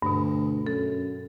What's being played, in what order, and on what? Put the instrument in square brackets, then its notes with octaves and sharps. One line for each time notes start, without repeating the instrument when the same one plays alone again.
[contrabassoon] D2 [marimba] G2 B2
[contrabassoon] F#2 [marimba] A4